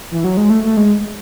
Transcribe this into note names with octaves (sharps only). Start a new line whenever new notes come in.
E3
F#3
G#3
A3
A3
G#3